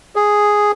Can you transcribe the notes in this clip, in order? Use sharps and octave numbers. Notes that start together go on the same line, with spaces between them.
G#4